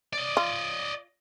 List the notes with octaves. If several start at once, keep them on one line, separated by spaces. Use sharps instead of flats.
D5 D#5
F4